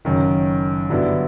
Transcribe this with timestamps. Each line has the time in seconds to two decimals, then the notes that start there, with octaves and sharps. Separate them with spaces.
0.05 F#1 F#2 D#3
0.90 G2 D3 F#3 B3 E4